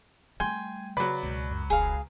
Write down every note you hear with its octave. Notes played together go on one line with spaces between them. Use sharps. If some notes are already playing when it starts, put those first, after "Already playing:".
G3 A3 G5 G#5 C6
C#3 F#3 B4 D5
C#2 B2
F#2
E1 G#4 F5